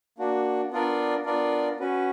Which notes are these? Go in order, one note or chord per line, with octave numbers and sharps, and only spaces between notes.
A#3 D4 F#4
B3 D4 F4 A#4 D5
B3 D4 F4 A#4 D5
C#4 F#4 B4